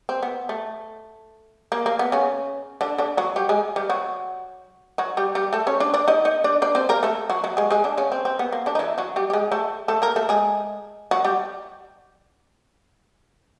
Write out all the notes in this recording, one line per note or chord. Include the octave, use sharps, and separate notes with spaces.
C4
B3
A3
A#3
A#3
B3
C#3 C#4
D3 D4
D3 D4
F#3 F#4
G3 G4
G#3 G#4
G3 G4
F#3 F#4
F#3 F#4
G3 G4
G3 G4
A3 A4
C#4 C#5
D4 D5
D4 D5
D#4 D#5
D#4 D#5
D4 D5
D4 D5
C4 C5
A#3 A#4
A3 A4
F#3 F#4
F#3 F#4
G#3 G#4
G#3 G#4
D3 D4
C#3 C#4
C4
C4
B3
A#3
D3 D4
D#4
E3 E4
F#3 F#4
G3 G4
G4
G#3 G#4
A3 A4
A3 A4
A#3 A#4
A3 A4
G#3 G#4
F#3 F#4
G3 G4